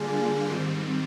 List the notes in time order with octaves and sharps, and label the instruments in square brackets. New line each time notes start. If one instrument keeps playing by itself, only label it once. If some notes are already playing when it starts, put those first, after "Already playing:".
Already playing: [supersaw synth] D3 G3 A#3 D4 F4 [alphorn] G#4
[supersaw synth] G#2 D#3 G3 C4